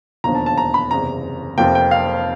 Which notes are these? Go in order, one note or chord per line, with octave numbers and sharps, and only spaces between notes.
E1 D#2 D3 F3 A#5
A5
A5
A#5
B5
F#1 E2 C3 A#5
F1 F2 C3 F3 A#3 G5
G5
F5